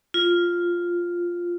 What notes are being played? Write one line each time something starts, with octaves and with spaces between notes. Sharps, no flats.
F4